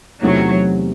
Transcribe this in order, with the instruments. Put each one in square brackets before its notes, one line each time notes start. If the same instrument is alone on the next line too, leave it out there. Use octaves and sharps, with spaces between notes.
[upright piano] E2 C3 E3 A3 D#4 [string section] F#3